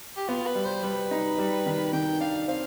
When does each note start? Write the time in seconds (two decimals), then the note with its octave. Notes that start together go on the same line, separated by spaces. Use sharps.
0.16 G4
0.28 B3 F4
0.46 B4
0.55 G3
0.65 C5
0.83 G3 B4
1.11 D#4
1.38 G3
1.66 D#3
1.93 D#3 G5
2.20 D4 F5
2.48 C4 F5